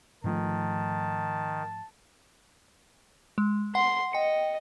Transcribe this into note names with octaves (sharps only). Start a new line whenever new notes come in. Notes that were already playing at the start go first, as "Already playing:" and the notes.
G#2 D#3 F3 A3 A5
G#3
F#5 C6
D#5 G5 C#7